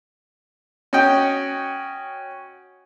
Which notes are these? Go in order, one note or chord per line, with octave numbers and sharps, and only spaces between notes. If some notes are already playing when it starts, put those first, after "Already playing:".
C#4 F#4 D#5 G5